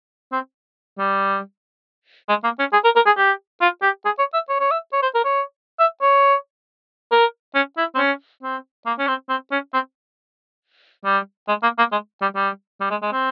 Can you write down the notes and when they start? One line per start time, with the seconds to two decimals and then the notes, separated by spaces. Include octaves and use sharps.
0.32 C4
0.99 G3
2.29 G#3
2.44 A#3
2.59 C#4
2.73 G#4
2.84 A#4
2.96 A#4
3.06 G#4
3.18 G4
3.61 F4
3.82 G4
4.05 G#4
4.19 C#5
4.34 E5
4.49 C#5
4.60 C#5
4.71 E5
4.93 C#5
5.03 C5
5.15 A#4
5.25 C#5
5.80 E5
6.02 C#5
7.12 A#4
7.55 C#4
7.77 E4
7.95 C4
7.98 C#4
8.43 C4
8.86 A#3
8.98 C#4
9.07 C4
9.29 C4
9.51 C#4
9.74 C4
11.05 G3
11.48 G#3
11.63 A#3
11.78 A#3
11.92 G#3
12.22 G3
12.36 G3
12.81 G3
12.90 G#3
13.02 G#3
13.12 C4